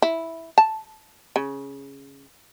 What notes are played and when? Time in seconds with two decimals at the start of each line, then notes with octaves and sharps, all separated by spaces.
0.02 E4
0.58 A5
1.36 C#3